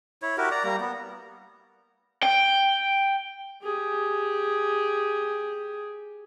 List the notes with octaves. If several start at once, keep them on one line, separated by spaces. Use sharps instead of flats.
E4 C#5
E4 F#4 G4 A#4
D5 A#5
G3 A#3 A#5
B3
G5
G4 G#4